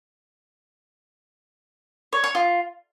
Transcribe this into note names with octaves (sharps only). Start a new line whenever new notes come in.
C#5
C#5
F4